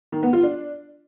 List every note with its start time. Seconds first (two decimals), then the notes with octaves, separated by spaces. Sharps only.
0.12 D#3
0.23 B3
0.33 F4
0.43 D4